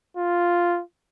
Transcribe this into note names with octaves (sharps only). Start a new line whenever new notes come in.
F4